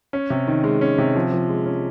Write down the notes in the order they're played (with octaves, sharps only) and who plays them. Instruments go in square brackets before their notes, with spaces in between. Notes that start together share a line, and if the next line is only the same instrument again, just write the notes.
[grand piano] C#4
C3
D#3
G#3
C#4
C3
F3
F3
G#3
C#4